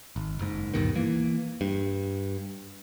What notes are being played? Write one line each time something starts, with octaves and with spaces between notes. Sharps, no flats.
G#1
F#1 G#2
D2 G2 B2 D#3
E3 A#3
G2